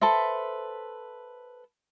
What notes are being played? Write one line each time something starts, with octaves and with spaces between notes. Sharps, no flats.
A4 B4 C5 E5